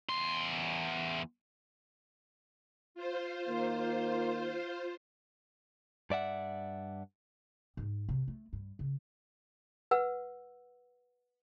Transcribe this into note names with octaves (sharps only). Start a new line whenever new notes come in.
E2 C6
F4 C5
D#3 A#3
G2 D5 E5 F#5
G#2
C3
A3
G2
C#3
B4 F#5 E6